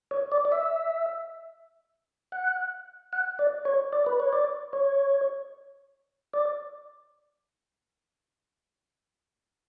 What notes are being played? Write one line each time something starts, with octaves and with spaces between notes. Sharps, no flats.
C#5
D5
D5
E5
F#5
F#5
D5
C#5
D5
B4
C#5
D5
C#5
D5